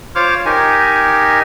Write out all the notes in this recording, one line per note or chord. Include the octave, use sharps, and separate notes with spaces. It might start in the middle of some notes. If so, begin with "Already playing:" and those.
F4 C5 C#5 D6 F6
D#4 G4 A#4 G#5